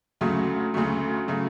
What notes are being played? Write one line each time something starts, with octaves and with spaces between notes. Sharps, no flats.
D2 C#3 F#3 A3
D2 C#3 F#3 A3
C#3 F#3 A3